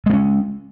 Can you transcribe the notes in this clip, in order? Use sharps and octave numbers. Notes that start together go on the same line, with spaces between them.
G#3 B3 C#4